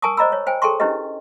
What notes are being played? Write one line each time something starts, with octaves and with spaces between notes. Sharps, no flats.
A#4 G#5 A5 C#6 D#6
C5 D5 D#5 A#5 B5 E6
C#5
C5 G5 G#5
G#4 A4 G5 A5 C6 C#6
C#4 D4 E4 G4 B4 D#5